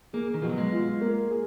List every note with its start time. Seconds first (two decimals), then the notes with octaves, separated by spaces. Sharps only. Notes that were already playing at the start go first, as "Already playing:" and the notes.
0.13 A#3 G#4
0.34 D#3
0.42 B2 F3
0.49 F#3
0.58 G#3
0.72 F4
1.01 A#3
1.31 G#4